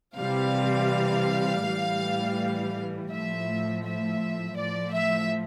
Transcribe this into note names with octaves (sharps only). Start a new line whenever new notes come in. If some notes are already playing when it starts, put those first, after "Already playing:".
C3 E3 G3 F5
A2 E3 G3
A2 F3 E5
E5
A2 F3 D5
E5